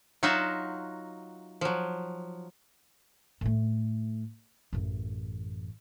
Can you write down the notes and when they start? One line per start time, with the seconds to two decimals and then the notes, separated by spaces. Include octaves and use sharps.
0.23 F#3 D#4 F4 F#4 E5
1.61 F3 F#3
3.41 A2 A3
4.73 A1 F#2